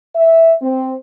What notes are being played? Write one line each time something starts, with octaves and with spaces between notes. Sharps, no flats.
E5
C4